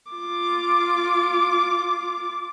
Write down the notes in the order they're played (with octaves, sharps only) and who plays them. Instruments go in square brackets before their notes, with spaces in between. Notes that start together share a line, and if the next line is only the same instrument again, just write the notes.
[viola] F4 D6